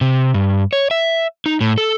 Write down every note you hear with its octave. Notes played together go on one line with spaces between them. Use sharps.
C3
G2
C#5
E5
D#4
A2
A4